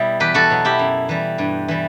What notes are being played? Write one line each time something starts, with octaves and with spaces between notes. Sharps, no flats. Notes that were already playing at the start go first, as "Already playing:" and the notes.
Already playing: B2 G3 E4
E2 G4 B4
F#4 A4
B2 F#3
E4 G4
F#2
E3 G3
G2
E3 G3